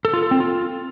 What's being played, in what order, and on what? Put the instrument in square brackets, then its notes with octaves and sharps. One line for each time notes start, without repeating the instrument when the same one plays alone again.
[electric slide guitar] A4
F4
A4
C4
F4